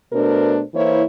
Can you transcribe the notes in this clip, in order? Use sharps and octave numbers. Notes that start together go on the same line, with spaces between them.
B2 A3 D4 A#4 C5
E3 A#3 E4 C5 C#5